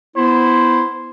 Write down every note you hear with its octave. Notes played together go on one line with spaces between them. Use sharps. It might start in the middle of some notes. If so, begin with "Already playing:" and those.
B3 E4 C5